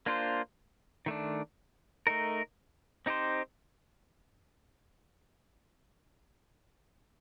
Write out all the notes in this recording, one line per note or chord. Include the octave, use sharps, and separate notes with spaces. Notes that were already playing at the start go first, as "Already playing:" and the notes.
A#3 D4 F4 C5
D#3 A3 D4
A3 D#4 A#4
C4 D#4 G4 C5